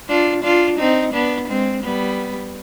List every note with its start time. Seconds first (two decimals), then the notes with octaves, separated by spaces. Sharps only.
0.08 D4 F4
0.43 D4 F4
0.78 C4 D#4
1.13 B3 D4
1.49 G#3 C4
1.83 G3 B3